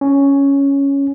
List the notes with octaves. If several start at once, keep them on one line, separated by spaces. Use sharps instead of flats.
C#4